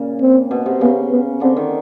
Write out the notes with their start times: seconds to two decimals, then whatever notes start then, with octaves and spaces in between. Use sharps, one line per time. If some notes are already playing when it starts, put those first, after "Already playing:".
Already playing: A#2 C#3
0.21 C4
0.51 B2
0.66 C3
0.81 C#3 B3
1.11 B3
1.41 D3 C4
1.57 D#3